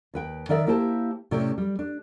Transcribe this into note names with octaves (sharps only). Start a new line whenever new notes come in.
D#2 B4 G5
D#3 A#4 D5 E5
A#3 E4 G4 C5 A5
A2 C3 C#4 G4 D5
G3
D4